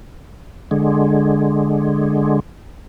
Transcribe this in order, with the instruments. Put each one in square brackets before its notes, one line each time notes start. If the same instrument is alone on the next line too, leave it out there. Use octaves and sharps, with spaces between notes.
[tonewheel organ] D3 G#3